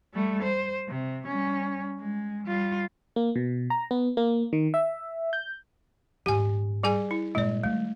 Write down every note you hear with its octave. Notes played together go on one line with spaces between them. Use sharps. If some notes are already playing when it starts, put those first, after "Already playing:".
G3 A3
C5
C3
G3 C#4
G#3
G3 F4
A#3
B2
A#5
B3
A#3
D#3
E5
G6
D#1 G#2 G4 G#5
G3 G#4 G#5
E4
G2 A#2 G#3 D5
D#3 G3 A3